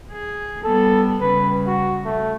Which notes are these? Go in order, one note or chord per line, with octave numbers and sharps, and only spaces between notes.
G#4
G3 B3 A4
C#3 G3 B4
F#4
A3